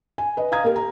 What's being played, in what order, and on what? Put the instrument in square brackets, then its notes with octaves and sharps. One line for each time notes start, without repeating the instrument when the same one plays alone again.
[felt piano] G#5
B4 D#5
F5 A#5 D#6 G#6
A#3 G4 A#4
A#5